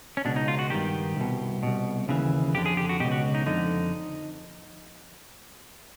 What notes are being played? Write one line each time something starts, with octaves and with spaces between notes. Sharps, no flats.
C#4
C#2 B2 D4
D#4
F4
F#4
G2 D#3 G4
C2 B2
C2 B2
D#2 C#3 E3
F2 D3 G4
G#4
G4
F#4
C#2 B2 G4
F#4
D#4
F2 D3 D#4